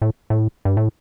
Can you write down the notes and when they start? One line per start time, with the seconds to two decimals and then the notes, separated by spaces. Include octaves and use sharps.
0.02 A2
0.30 A2
0.65 G2
0.77 A2